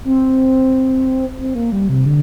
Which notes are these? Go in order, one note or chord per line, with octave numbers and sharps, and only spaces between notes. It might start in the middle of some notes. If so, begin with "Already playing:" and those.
C4
C4
A#3
G3
C3
D3